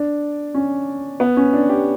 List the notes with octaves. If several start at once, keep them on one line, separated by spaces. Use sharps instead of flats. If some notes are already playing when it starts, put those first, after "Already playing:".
Already playing: D4
C#4
B3
C#4
D4
G4